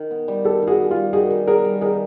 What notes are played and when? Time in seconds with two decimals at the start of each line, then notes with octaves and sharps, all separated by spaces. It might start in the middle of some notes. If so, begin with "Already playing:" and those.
Already playing: D#3
0.11 B3
0.28 G3
0.45 D#3 G4 A4
0.62 D#3
0.67 F#4 G#4
0.79 B3
0.90 F4 G4
0.96 G3
1.13 D#3 F#4 G#4
1.31 D#3
1.47 B3 G#4 A#4
1.65 G3
1.81 D#3 G#4 A#4